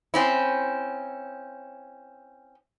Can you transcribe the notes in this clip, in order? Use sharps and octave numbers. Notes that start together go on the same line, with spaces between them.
C4 C#4 E4